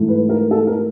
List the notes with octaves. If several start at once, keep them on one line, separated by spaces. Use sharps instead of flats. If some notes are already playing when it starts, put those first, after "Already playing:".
Already playing: G#2 E3 A3
B4
A#4
A4
A#4